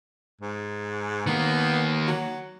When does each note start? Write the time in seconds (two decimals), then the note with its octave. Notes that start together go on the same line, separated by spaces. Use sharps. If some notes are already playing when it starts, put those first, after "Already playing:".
0.41 G#2
1.27 D#3 A#3 B3
2.07 F#3